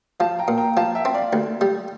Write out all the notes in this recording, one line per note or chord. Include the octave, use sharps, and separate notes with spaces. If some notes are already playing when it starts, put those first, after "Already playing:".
F3 F5 A5
G5 A#5
A#2
G5 A#5
F3 F5 A5
E5 G5
C4
D5 F5
D2
G3